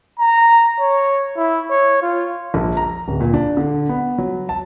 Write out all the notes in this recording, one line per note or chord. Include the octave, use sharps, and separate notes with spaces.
A#5
C#5
E4
C#5
F4
A#1
A#5
D1
A#2
D4
D3
B3
F#3
A5